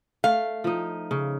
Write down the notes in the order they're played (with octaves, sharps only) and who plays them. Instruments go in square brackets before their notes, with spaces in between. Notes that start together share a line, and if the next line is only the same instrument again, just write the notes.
[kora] A3 [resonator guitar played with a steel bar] F5
[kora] F3 D#4
C#3